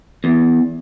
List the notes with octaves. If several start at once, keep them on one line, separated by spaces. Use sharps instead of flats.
E2